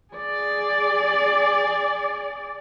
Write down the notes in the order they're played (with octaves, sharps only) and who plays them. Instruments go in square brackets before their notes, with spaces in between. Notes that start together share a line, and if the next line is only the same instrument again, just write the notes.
[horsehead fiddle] G#4 D5